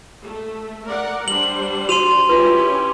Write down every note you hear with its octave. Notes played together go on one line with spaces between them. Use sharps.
A3
A#4 D5 F#5
G3 D4 C5 F#7
F#4 C6 D#7 F7
C#4 E4 F4 G4 B4